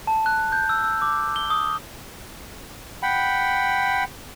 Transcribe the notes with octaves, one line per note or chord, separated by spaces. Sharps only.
A5
F#6
G6
E6
E6
D6
G7
D#6
F#5 G5 B5